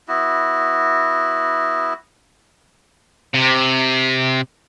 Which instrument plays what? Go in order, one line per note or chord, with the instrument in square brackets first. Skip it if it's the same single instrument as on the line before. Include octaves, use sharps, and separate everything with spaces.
[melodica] B3 E4 F#4
[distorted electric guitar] C3